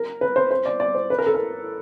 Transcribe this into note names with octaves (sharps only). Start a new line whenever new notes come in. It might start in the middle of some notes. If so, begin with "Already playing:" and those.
Already playing: A#4
B4
C5
C5
D5
D5
C5
B4
A#4
A4
A#4